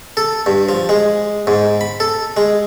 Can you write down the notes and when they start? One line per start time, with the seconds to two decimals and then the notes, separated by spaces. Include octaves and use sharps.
0.17 A4
0.46 G2
0.69 F3
0.89 G#3
1.47 G#2
1.81 B5
2.00 A4
2.37 G#3